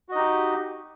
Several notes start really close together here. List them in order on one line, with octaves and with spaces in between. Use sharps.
F#4 D#5 D#4 G4